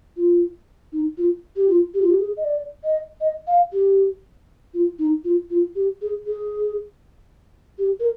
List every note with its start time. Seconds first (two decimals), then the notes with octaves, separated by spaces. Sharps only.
0.17 F4
0.92 D#4
1.18 F4
1.56 G4
1.69 F4
1.94 G4
2.02 F4
2.10 G4
2.20 G#4
2.37 D#5
2.45 D5
2.84 D#5
3.21 D#5
3.47 F5
3.73 G4
4.74 F4
4.99 D#4
5.24 F4
5.50 F4
5.75 G4
6.02 G#4
6.26 G#4
7.78 G4
8.00 A#4